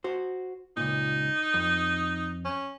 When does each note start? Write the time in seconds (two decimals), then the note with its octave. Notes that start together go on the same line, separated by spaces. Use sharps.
0.04 F#4 C5
0.77 C#2 A#2 D#4
1.54 F2
2.45 C#4